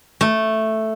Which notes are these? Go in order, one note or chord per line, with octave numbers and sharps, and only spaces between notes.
A3